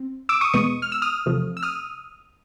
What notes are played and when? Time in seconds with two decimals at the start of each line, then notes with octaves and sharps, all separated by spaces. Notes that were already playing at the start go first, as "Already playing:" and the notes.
Already playing: C4
0.29 D6 E6
0.41 C#6 D#6
0.53 E2 B2 G#3 B3 C#6 D#6
0.82 F6
0.92 E6
1.02 D#6 F6
1.26 E2 C3 F3 A3
1.57 E6
1.63 D#6 F6